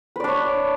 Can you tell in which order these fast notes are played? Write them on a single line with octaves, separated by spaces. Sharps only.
B4 D5 D4 C#5